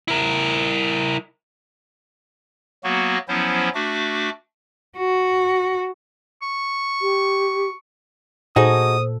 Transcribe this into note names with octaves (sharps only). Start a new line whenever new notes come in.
E4 A#4
F#3 A#3 B3 F#4
F3 F#3 B3 C#4 E4 C5
A3 D4 F#4 D6
F#4
C#6
G4
A#2 D#4 F#4 G#4 A4 C5 D#6